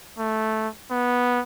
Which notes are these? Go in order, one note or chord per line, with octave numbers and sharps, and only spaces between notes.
A3
B3